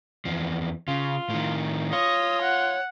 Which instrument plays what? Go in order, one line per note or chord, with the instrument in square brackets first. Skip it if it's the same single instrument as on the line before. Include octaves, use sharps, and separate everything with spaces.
[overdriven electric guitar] E2 F3
[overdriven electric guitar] C#3 [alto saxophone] F4
[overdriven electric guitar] A2 D#3
[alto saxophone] F4 [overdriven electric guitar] C#5 [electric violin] D#6 A#6
[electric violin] F#5